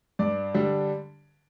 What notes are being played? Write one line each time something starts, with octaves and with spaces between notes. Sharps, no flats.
G2 D5
D3 G3 D4